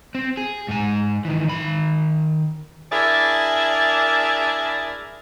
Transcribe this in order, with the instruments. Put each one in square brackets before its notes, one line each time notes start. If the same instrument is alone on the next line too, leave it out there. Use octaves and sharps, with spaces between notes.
[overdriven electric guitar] C4
G#4
G#2 G#5
D#3 E3
D#3 B5
[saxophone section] D4 E4 G#4 A#4 D5 E5